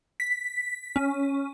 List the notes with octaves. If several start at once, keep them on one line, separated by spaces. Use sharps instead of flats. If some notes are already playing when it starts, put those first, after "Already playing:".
B6
C#4